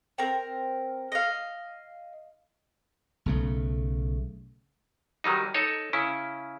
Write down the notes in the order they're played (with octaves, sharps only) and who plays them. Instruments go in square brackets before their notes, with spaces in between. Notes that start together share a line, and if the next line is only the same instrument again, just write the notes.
[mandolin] C4 A#4
D#5 F5
[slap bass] B1 C#3 A3
[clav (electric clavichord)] D#3 F#3 G3 D#4
D#4 A4 C#5
C#3 C#4 E4